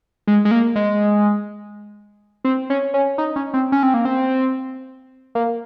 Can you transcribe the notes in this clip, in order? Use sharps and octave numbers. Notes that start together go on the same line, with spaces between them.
G#3
G#3
A#3
G#3
C4
C#4
C#4
D#4
C#4
C4
C#4
C4
A#3
C4
A#3